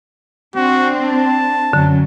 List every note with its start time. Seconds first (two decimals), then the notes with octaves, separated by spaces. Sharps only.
0.55 C4 D4 F#4
1.05 A5
1.73 F#2 D3 F#3 C#4